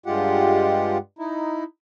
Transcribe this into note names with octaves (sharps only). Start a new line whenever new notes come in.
G2 G#3 F4 G4 F#5
D#4 E4